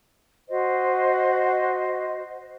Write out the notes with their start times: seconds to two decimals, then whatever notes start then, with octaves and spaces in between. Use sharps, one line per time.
0.48 F#4 C5 D#5